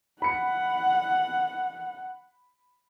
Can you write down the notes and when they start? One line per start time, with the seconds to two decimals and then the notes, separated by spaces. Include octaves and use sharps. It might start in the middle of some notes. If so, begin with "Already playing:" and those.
0.22 F#5 B5 C#7